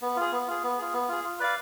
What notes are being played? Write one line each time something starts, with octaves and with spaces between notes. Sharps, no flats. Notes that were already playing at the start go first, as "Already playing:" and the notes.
B3
F4 G#4
B3
F4 G#4
B3
F4 G#4
B3
F4 G#4
F4
B4 D5 F5